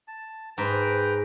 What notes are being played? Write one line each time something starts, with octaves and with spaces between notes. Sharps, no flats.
A5
G#2 B4 G5 A#5